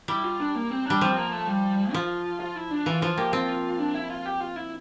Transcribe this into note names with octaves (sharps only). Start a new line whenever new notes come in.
G3 E4
F4
D4
A#3
C4
G3 D4
F3 C4
A#3
A3
G3
F3 F4
F4
E4
D4
E3 F4
F3 F4
A#3 G4
C4 F4
D4
E4
F4
G4
F4
E4